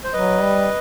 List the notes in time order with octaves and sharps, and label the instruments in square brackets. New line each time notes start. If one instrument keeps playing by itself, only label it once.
[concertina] C5
[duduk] F#3 [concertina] B4 D#5
[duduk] G3